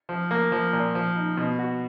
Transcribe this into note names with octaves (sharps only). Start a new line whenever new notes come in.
F3
A#3
F3
A#2
F3
D#4
B2
F#4